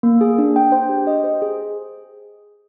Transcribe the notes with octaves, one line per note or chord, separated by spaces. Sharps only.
A#3
G#4
D4
G5
C5
G4
D#5
C5
G#4